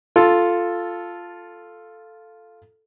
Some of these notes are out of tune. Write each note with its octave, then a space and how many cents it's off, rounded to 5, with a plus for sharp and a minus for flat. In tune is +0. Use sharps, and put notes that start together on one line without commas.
F4 +0 A4 +0